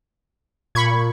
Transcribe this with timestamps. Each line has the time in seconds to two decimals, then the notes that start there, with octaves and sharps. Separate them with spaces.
0.75 A#2 B5 C#6 G#6